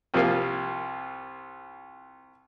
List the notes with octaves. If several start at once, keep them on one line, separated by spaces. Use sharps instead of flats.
C2 F3 G3 A#3 F5